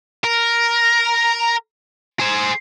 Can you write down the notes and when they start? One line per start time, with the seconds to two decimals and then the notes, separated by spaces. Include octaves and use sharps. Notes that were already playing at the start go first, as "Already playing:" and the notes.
0.24 A#4
2.19 G#4 C5